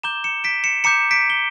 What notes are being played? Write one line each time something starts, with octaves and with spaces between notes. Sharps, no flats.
A#5 D6 G6 E7 G7
C#7 E7
B6 D7
C#7 E7
A#5 D6 G6 C#7 E7
B6 D7
G7